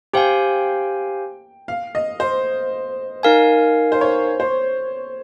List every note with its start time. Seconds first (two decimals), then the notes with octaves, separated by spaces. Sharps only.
0.13 G4 C5 F5 G5 G#5
1.68 F5
1.95 D#5
2.20 C5
3.23 D#4 A#4 F5 G#5
3.92 C5
4.01 C#5
4.40 C5